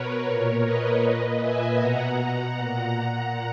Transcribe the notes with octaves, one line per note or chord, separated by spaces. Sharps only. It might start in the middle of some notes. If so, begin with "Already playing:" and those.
Already playing: B2 A#4 B4 C#5
A#2
B4 D#5
A#2
E5 G#5
B2 F#5 A#5
F#5 A#5
A#2